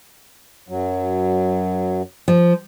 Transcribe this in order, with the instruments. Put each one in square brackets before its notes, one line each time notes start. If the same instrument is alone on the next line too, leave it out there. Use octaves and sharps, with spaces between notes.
[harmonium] F#2 F#3
[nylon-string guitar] F3